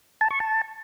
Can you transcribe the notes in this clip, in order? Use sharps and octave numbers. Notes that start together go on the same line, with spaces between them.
A5
C#6
A5